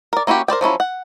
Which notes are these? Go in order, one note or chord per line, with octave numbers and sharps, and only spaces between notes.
A#4 D5
A#3 C#4 E4 F#4 G4
A#4 C5 D5 G5
F3 F#3 C#4 E4
F#5